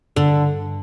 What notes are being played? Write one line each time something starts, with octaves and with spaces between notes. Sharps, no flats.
G2 D3